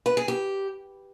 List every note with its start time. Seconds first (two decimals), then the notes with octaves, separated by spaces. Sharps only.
0.06 B4
0.17 G#4
0.28 G4